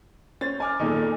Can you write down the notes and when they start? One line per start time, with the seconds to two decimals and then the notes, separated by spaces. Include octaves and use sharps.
0.41 C#4 C5 A6
0.60 G#5 D6 F6
0.80 F2 A#2 D#3 D#4 G#4 A4